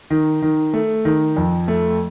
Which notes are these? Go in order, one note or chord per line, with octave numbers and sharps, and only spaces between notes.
D#3
D#3
A3
D#3
F2
A3